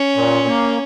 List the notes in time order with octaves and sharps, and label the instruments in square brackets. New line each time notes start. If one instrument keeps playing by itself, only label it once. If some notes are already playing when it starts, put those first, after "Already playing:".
Already playing: [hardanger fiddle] C#4
[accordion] A#2
A#3